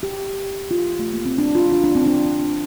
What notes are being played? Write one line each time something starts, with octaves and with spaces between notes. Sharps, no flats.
G4
F4
A3
A#3
C4
D4
F4
F4
D4
C4
D4